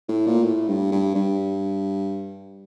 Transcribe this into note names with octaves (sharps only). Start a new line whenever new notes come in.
A2
A#2
A2
G2
G2
G2